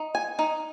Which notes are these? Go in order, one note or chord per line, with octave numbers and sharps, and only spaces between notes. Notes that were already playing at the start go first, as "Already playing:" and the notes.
Already playing: D#4
G#5
D#4